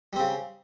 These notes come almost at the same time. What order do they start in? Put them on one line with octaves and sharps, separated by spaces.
G3 C4 C#3